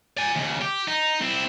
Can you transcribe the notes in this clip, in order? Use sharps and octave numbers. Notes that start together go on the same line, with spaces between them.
D5 G#5
D#2 C#3
G4
D#4
C4 E4